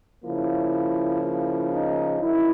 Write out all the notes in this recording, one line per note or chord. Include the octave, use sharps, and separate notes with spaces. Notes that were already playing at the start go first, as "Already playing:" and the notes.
C#3 F3 A#3 E4
E4
D#4
F#2 D#3 E4